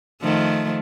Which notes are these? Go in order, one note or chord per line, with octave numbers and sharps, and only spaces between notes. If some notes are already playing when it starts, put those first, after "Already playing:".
D#3 F3 A3